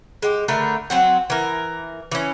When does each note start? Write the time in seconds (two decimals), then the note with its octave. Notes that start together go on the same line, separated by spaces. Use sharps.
0.22 G#3 G4
0.48 D3 A3 A#4 B4
0.90 F#3 C4 F#5
1.30 E3 A#4
2.11 E3 C#4